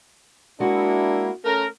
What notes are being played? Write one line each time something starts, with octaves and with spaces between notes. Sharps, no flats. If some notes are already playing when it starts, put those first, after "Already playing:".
G#3 A#3 D4 E4 F#4
A3 C#4 A#4